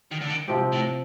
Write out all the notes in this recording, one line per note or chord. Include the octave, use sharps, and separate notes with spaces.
D#3
D3
D#3
C3 F3 C4 G4
A2